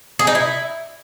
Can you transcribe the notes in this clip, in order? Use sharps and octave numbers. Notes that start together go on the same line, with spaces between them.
G#4
D#4
E4